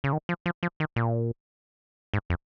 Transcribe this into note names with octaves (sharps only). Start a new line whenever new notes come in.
C#3
D#3
F3
F3
F3
D#3
A#2
G#2
F2